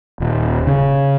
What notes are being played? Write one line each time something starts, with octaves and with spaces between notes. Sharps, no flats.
D#1
C#3